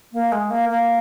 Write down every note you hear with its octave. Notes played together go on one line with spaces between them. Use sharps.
A#3
G#3
A#3
A#3